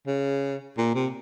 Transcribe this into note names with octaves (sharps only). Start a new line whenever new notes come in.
C#3
A#2
C3